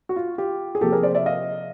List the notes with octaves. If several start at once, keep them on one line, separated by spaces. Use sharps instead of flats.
F#4
F4
F4 G4
G#4
C3 F3 A#3 G4 A4
G#4 A#4
C5 D5
D5 E5
D#5 F5